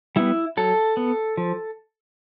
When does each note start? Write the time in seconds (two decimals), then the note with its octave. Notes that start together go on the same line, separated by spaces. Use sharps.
0.16 G3 B3 E4
0.57 F#3 A4
0.97 B3
1.37 F3